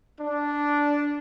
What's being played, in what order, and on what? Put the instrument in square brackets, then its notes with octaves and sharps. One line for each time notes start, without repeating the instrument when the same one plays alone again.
[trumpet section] D4